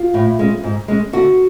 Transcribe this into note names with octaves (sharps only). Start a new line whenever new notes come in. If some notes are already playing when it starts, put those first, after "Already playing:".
Already playing: F4
A2
G#3 C#4
G#2
G#3 C#4
D3 F#4